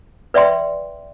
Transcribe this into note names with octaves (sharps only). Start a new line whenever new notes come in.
B4 D5 E5 G5 C6